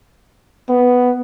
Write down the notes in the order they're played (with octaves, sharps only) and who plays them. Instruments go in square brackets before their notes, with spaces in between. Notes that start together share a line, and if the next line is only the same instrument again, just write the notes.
[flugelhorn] B3